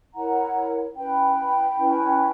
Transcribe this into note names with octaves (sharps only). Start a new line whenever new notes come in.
E4 A#4 C#5 F#5 A#5
C#4 E4 B4 G5 B5
C#4 E4 B4